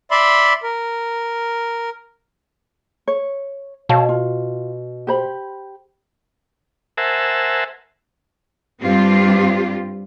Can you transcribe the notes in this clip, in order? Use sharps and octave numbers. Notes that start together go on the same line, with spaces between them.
D5 E5 B5 C6
A#4
C#5
B2 C#5 F5 A5
F4
G4 C5 B5
A#4 C5 E5 F#5 G#5 A5
G2 G3 C4 F4 G4